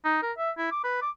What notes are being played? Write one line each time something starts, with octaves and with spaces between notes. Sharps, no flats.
D#4
A#4
E5
E4
D6
B4
D6